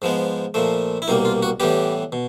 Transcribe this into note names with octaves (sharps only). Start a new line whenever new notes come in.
G#2 F3 G#3 B3
A#2 F3 A3
E4
C2 B2 G3 A#3 D#4
F4
F#4
A2 E3 G3 B3 G4
B2